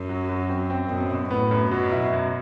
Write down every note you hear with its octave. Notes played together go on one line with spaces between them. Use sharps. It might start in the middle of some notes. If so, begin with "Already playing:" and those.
Already playing: F#2
F#3
F#3
C4
C4
F#2 B2
B2
A2 B3
F#2
B2 F#3
E4
F#2